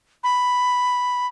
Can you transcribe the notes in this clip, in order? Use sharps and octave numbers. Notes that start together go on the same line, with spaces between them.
B5